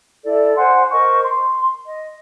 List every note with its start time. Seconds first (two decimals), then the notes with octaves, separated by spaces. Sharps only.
0.24 E4 A4 D5
0.56 C5 F#5 G#5 C6
0.90 A#4 C5 D#5 C#6
1.23 C6
1.86 D#5